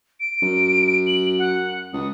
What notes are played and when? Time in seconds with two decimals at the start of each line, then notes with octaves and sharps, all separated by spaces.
0.20 D7
0.42 F#2
1.07 F#7
1.39 F#5
1.93 C#2 D#6